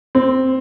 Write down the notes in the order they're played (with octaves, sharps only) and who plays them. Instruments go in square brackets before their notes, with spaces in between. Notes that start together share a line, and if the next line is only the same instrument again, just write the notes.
[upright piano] C4